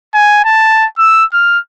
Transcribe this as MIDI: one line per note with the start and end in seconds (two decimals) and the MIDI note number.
0.15 0.44 80
0.45 0.86 81
0.98 1.25 88
1.34 1.59 89